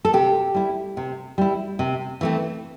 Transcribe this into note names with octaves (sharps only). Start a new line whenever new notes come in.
A4
C3 G4
G3 E4
C3
G3 E4
C3
E3 A3 C4